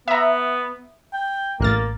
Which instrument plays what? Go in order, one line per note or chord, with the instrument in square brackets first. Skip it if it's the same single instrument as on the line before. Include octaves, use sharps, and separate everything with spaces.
[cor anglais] B3 [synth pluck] E5 A#5
[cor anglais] G5
[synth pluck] A1 F6 A6 [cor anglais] A#3